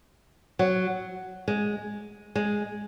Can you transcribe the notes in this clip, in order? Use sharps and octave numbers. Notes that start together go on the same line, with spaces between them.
F#3
G#3
G#3